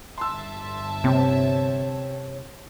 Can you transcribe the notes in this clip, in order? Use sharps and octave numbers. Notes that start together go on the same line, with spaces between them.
G1 E5 A5 C6 E6
C3 C4 C#5